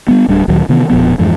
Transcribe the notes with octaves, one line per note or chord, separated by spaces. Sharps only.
G3 B3
D1 G3 D4
D2 A#2 D#3 F#3
C3 D#3 E3 B3
E1 A#2 F3 B3
F2 G#2 E3